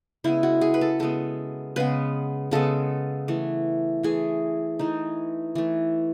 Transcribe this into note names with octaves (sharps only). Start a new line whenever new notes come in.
C#3 G#3 B3 E4
F#4
G#4
B4
A4
C#3 G#3 B3 A4
C#3 G#3 B3 B4
C#3 G#3 B3 A4
E3 A3
E3 A3 G#4
E3 A3 D#4
E3 A3